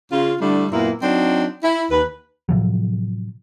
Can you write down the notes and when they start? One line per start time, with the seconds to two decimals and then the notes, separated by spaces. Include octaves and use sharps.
0.12 C#3 F4
0.41 D3 G3 A3 D4 E4
0.72 F#2 A#2 A#3 B3 E4
1.03 F#3 C4 D4 D#4
1.64 E4
1.91 D#2 B4
2.49 A2 C3 F3 F#3